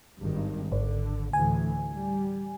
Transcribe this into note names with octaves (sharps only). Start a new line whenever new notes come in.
G#1 G2 D#3
G#1 D3
D2 A2 E3 G#5
G3